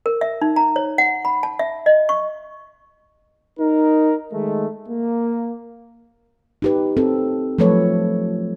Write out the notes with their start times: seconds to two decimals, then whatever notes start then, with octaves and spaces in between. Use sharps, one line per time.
0.06 A#4
0.21 E5
0.42 D#4
0.56 A#5
0.76 C#5
0.98 F#5
1.25 B5
1.43 A5
1.59 E5
1.86 D#5
2.09 C#6
3.59 D#4 A#4
4.33 D#3 G#3 A3
4.88 A#3
6.62 D#4 G4 B4
6.97 C4 A4
7.58 F3 F#3 A3 A4 B4 C#5